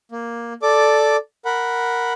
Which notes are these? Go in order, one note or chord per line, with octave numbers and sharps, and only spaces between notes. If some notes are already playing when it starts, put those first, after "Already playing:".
A#3
A4 D5 D6
A#4 F#5 B5